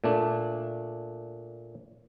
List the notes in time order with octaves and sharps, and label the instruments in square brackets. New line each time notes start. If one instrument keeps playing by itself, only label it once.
[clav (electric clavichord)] A#2 A3 D4